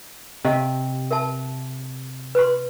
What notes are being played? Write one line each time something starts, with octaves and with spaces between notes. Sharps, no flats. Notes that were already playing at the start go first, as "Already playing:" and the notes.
C3 G4 D#5 F5
A#4 E5 A5
B4 C6